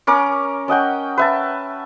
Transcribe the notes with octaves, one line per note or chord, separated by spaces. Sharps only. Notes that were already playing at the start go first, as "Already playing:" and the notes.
C#4 A#4 D6
C#4 D#5 F#5 G5
B4 E5 A5